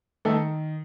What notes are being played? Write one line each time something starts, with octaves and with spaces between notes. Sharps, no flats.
D#3 A3 A4